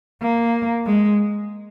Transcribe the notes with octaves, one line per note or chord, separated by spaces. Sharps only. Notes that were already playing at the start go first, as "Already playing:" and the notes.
A#3
G#3